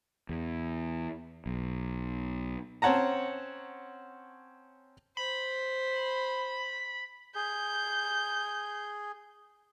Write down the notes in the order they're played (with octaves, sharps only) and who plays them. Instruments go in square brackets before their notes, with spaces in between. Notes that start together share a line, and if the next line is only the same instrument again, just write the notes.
[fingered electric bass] E2
B1
[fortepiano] C4 C#4 C#5 F#5 A5 A#5
[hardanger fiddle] C5 [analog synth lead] B5
[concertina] G#4 [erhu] G6